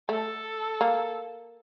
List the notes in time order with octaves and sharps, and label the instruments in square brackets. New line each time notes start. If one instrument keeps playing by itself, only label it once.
[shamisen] A3 [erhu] A4
[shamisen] A#3